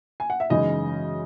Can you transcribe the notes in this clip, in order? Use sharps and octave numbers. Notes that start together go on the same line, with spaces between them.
G#5
F#5
E5
F#2 C#3 E3 G#3 C#4 D#4 D#5